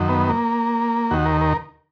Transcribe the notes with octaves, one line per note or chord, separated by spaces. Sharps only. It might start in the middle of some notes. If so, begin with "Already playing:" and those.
Already playing: F#2 D#3
B3
A#3
D#2 D#3 F#4
A#4
A#4